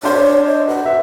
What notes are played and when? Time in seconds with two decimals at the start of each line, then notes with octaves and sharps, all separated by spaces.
0.03 D4 C5 C#5
0.46 D#5
0.68 B4 F#5
0.85 C5 E5